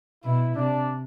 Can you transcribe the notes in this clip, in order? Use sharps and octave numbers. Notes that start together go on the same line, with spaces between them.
B2 E4
C3 D4